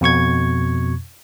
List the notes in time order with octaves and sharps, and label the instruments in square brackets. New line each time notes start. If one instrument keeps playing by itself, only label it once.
[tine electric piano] F2 B2 C#6 G#6